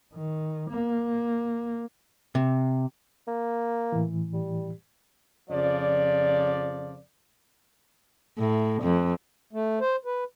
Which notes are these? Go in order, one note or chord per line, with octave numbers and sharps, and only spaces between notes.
D#3
A#3
C3
A#3
A2 E3
G3
F2 C#3 F3 D5
A2
F2
A3
C5
B4